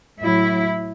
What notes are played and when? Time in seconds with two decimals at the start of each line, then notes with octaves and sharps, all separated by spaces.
0.22 A2 F#3 E4